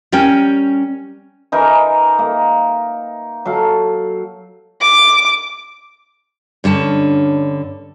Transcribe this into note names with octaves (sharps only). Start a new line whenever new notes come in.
G3 C#4 A#4 G5 G#5
E3 D#4 A#4 G#5
A#3
F#3 A4 F5
D6
G2 D3 C#4 A5